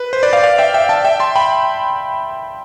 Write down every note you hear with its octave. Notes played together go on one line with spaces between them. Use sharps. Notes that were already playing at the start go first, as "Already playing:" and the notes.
Already playing: B4
C5
B4 D5
D5 F5
D5 F5
E5 G5
E5 G5
F5 A5
E5 G5
A5 C6
G5 B5